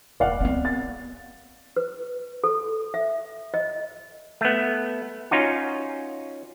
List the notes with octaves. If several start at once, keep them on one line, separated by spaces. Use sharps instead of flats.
E1 A#3 D5 F5 F#5
B3 C4
A6
B4
A4
E5
D#5
A3 B3
C#4 D#4 F4 F#4